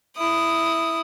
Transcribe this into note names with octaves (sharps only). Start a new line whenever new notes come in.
E4 D#6